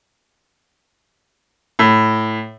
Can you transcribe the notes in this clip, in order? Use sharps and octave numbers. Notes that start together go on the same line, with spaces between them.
A2